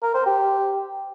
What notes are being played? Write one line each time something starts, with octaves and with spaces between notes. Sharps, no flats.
A#4
C5
G4